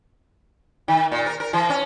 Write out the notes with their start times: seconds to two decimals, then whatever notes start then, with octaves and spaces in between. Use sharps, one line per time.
0.88 D#3
1.12 A#2
1.26 A#4
1.40 A#4
1.53 E3
1.70 C#4